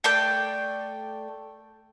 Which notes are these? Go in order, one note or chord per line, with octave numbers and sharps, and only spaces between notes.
A3 D5 G5